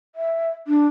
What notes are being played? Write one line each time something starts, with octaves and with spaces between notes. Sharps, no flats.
E5
D4